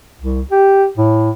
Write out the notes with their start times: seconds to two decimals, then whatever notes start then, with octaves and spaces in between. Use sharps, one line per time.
0.21 C2
0.51 G4
0.97 A2